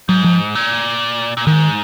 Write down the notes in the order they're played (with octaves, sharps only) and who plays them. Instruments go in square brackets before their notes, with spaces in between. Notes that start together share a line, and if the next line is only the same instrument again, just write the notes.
[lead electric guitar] G#2 [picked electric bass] F#3
[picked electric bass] F3
[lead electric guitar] A#2
A#2
[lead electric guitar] G#2 [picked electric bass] D#3